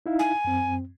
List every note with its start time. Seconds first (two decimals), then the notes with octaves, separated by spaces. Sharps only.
0.06 D#4 E4 F5
0.19 G#5
0.45 F#2 C4